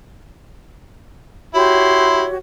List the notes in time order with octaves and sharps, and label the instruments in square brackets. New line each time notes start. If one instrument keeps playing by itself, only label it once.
[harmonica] E4 C6 [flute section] F#4 G4 C#5